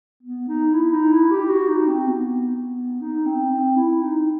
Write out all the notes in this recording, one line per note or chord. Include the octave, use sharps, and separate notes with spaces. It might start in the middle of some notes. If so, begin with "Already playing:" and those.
B3
D#4
E4
D#4
E4
G4
F#4
D#4
C4
B3
D#4
C4
C4
E4
D#4